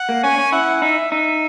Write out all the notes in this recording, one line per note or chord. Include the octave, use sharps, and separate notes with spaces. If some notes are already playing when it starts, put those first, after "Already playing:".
Already playing: F#5
A#3
C#4 G#5
C#4
E4 F#5
D#4 E5
D#4 E5